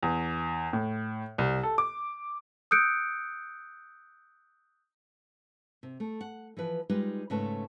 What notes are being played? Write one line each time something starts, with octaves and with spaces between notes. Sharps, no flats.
E2
A2
C2
A4
D6
D#6 E6 F#6 G6 C#7 D7
C3
A3
F#5
E3 F3 B4
G3 G#3 D#4 F4 G4 B4
G#2 C#3 A3 B4 C#5 A5